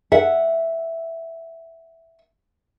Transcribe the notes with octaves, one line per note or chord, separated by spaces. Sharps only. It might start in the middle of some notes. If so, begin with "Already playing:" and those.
E5 F#5